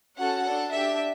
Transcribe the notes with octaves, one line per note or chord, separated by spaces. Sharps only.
C#4 F#4 A4 F#5
D4 A4
D4 G4 E5